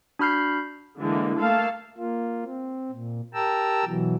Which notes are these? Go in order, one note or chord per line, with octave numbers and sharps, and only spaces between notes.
D4 F#4 B5 F6 G6 C7
D3 E3 G#3 A#3
A3 A#3 A4 F5 A5
A#3 F4
C4
A#2
G4 A#4 G5 A5 A#5 E6
B2 E3 F#3